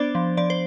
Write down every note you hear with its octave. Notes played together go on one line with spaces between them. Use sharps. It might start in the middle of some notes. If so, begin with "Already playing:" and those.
Already playing: B3 D4 C5 D5
F3
F3 D5
C5